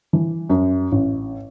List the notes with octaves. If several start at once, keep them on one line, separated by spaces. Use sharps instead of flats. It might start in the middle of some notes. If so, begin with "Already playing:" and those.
E3
F#2
A1